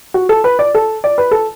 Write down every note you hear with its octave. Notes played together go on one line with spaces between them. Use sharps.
F#4
A4
B4
D5
A4
D5
B4
A4